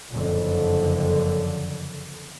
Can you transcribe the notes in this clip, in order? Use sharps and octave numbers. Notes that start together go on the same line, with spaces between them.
F#1 F2 D3